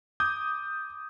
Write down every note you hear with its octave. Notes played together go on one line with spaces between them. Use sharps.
D6 D#6 G6